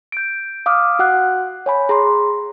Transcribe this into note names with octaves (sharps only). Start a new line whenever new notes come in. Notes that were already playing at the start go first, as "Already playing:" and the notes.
G6 D7
F5 D6 D#6 F6
F#4 F#5 F#6
C#5 G#5 B5
G#4 A#5 C6